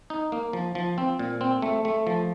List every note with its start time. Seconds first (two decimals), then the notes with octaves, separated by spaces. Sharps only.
0.10 D#4
0.32 A#3
0.53 F3
0.75 F3
0.98 C4
1.19 A#2
1.41 C4
1.62 A3
1.85 A3
2.07 F3